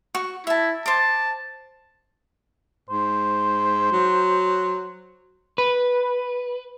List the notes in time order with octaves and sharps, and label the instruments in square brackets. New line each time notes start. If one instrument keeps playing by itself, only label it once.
[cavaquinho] F#4 C#6
[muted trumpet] E4 [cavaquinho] E5 A5
[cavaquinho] C5 D6 [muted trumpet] A5
[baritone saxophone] G#2 [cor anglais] C5
[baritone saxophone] F#3
[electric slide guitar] B4